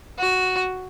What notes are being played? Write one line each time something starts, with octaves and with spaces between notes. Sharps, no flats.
F#4